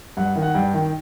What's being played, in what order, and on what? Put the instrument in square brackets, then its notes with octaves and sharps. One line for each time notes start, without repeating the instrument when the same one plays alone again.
[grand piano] G2 F#5
D#3
F#5
G2 G5
D#3